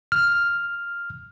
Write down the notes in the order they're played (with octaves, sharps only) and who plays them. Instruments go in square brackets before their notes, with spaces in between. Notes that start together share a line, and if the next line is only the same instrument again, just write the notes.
[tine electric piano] F6